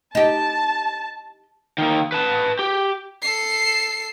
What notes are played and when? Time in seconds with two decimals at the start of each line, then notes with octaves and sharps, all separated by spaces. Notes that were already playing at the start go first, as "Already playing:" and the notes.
0.15 D#4 G4 A5
1.78 D#3 A#3
2.12 B4 A5
2.59 G4
3.22 A4 C7